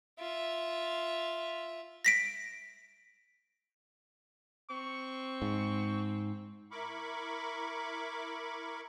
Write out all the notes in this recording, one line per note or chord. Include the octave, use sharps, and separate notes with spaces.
F4 E5
A#6 B6 D7
C4 C#6
G#2
E4 A#4 B5 C#6 D6